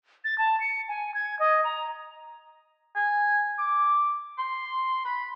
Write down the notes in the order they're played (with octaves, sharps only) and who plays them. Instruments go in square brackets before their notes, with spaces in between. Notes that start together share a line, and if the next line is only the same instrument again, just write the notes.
[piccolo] A6
A5
C#7
G#5
G#6
D#5
A#5
[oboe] G#5
D6
C6
B5